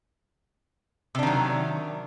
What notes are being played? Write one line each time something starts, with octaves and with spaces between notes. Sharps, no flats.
C3 D#3 F#3 D4